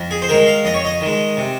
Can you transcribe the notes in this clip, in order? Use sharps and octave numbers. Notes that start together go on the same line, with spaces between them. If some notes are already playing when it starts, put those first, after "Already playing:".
Already playing: F2
G#4
C5
D#3 G#3 A#4
F5
F2 D#5
C#5
D#5
D#3 G#3
C3